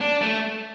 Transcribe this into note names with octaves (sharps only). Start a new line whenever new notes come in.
D4
A3